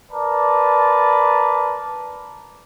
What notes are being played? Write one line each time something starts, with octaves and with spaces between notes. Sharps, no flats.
A#4 B4 D5 A5